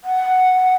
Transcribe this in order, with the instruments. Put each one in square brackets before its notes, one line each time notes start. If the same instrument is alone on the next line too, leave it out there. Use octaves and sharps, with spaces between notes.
[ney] F#5